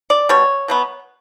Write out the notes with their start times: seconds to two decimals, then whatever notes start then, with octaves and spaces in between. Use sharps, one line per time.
0.10 D5
0.29 B2 G3 C#5
0.68 B2 F#3 B3